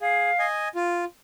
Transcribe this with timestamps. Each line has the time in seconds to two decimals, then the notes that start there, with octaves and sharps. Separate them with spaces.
0.01 G#4 F5
0.39 D#5 G#5
0.75 F4